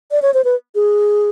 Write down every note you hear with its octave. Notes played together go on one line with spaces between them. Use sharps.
D5
C#5
C5
B4
G#4